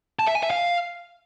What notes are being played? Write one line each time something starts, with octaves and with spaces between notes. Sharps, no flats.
A5
E5
G#5
E5
F5